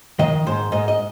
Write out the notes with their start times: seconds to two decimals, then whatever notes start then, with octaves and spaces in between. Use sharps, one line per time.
0.19 D#3 D#5
0.47 G#2 C5
0.72 G#2 D#5
0.88 D#5